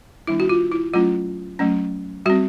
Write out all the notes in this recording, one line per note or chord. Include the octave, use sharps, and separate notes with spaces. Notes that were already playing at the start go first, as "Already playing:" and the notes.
D#3 G3 B3 D4 E4
F#4
F4
E4
F#3 A3 C#4 F4
F#3 A3 C#4
G3 C4 F#4